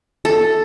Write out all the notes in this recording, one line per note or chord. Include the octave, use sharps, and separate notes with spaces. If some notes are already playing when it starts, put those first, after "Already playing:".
A4